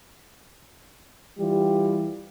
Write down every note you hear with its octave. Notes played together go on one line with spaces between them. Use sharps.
E3 G3 F4 G4